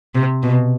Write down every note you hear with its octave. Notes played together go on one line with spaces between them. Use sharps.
C3
B2